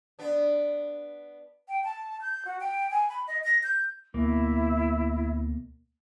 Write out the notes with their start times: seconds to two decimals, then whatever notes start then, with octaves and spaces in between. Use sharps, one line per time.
0.19 B3 D4
1.68 G5
1.84 A5
2.21 G6
2.45 F#4
2.60 G5
2.91 G#5
3.09 B5
3.27 D#5
3.44 A#6
3.63 G6
4.14 D2 B2 A#3 E4